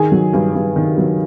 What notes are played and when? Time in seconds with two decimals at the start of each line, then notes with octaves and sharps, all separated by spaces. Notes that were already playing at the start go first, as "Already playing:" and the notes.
Already playing: D#3 G#4 G#5
0.12 F#3
0.33 G2
0.55 G2
0.76 D#3
0.98 F#3